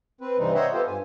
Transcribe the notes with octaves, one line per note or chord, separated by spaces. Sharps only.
C4 B4
G2 C3 E3 G3 C4 D#4
C5 C#5 D#5 E5 F#5 G5
B3 F4 G4 A4 C5
G2 G#5